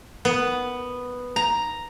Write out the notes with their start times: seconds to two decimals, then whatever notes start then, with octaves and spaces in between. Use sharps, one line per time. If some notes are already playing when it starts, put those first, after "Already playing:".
0.25 B3
1.36 A#5